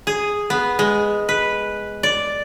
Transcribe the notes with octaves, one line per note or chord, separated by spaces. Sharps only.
G#4
B3
G#3
B4
D5